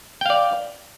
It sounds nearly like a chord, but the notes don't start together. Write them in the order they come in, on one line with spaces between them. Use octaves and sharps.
G5 F5 D5